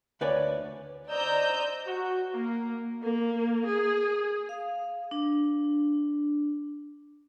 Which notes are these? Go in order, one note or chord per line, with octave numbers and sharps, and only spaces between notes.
D2 B4 C#5 D5 G#5
C5 D5 D#5 A#5 E6 G6
F#4
A#3
A#3
G#4
F5
D4